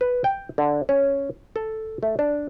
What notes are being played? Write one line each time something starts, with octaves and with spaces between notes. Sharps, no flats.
B4
G5
D3
C#4
A4
A3
D4